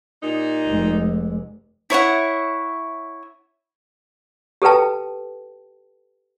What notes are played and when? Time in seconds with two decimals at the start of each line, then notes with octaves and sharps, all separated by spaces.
0.23 A#2 G3 D#4
0.65 F1 G#3
1.90 E4 C#5 E5 F#5
4.62 G4 A4 B4 G5 A5